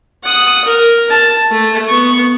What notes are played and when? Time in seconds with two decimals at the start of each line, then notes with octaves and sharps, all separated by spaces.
0.24 F#5 D#6
0.65 A#4
1.10 A5
1.51 A3
1.88 B3 C#6